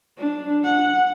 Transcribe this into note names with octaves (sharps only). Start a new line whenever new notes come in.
D4
F#5